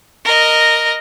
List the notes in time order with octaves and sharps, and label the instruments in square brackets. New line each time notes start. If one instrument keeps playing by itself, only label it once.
[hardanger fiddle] A#4 D#5